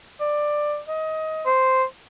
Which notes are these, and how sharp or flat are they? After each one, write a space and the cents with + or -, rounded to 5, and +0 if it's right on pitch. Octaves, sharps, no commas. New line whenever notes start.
D5 +15
D#5 +20
C5 -5